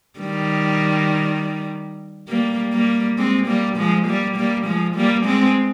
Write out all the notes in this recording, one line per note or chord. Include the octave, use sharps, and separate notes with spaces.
D#3 G3
G3 A#3
G3 A#3
G#3 C4
G3 A#3
F3 G#3
G3 A#3
G3 A#3
F3 G#3
G3 A#3
G#3 C4